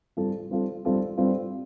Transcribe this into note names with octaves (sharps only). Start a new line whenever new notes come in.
G3 C4 F4 A4
G3 C4 F4 A4
G3 C4 F4 A4
G3 C4 F4 A4